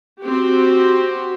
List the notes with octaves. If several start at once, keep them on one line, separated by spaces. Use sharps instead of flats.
C4 F#4 G4